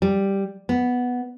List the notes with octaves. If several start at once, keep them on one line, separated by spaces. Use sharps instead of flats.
G3
B3